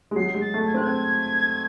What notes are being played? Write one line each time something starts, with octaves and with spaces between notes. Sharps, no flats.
G#3
F#3 C7
G#3
A6
A3
G#6
C4 F#6
G#6